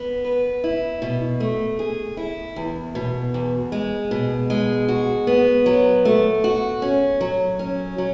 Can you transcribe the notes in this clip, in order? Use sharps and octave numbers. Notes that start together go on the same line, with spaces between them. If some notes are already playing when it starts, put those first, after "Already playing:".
Already playing: B3
B4
E4
B2
A3
G#4
E4
E2
B2
E2
G#3
B2
G#3
F#4
B3
F#3
A3
F#4
C#4
F#3
C#4
F#3